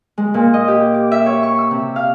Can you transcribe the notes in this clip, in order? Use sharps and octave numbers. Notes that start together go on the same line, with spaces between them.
G#3
A#2
D#5
G4
D6
E5
C#5
C#6
E6
C3
F5